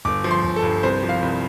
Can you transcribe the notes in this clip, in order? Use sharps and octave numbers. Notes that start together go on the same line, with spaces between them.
G1 D6
F3
C6
G1
A4
G2
C2 C5
F3
F5
C2